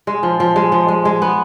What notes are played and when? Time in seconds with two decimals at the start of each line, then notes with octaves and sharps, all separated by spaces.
0.07 G#3
0.23 F3
0.40 F3
0.56 G#3
0.72 F3
0.88 G#3
1.05 G#3
1.22 B3